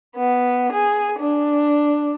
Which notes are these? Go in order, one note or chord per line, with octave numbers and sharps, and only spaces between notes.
B3
G#4
D4